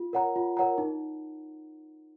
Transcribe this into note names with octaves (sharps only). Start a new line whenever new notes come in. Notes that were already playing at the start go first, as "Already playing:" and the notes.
Already playing: F4
A#4 C#5 F#5 A#5
F4
A#4 C#5 F#5 A#5
D#4